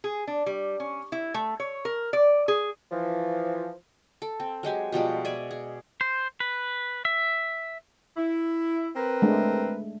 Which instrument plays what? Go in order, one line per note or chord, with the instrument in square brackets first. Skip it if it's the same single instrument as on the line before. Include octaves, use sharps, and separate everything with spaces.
[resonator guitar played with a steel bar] G#4
D4
G3
C#4
E4
A3
C#5
A#4
D5
G#4
[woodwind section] E3 F3
[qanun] A4
C4
F#3 G#3 G4 G#5
B2 F3 G3 G#3
D5 E5 G#5
G#4
[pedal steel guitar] C5
B4
E5
[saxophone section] E4
C4 A#4 B4
[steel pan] G#3 A3 D4